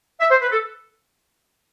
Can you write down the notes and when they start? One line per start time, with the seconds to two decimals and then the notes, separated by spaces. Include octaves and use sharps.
0.20 E5
0.31 C5
0.42 B4
0.52 A4